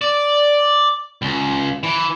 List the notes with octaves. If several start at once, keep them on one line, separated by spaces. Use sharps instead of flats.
D5
C#2
E3